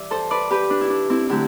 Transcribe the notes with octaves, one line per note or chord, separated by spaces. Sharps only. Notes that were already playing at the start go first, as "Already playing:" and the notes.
Already playing: G2 E3 D5 E5
A4 C5
B4 D5
G4 B4
D4
E4
D4
C4 E4
D3 F#3 A3 E4 G4